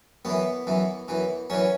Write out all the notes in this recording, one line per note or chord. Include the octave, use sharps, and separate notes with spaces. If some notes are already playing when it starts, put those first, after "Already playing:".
F#2 E3 B3
F#2 E3
F#2 E3
F#2 E3 C#4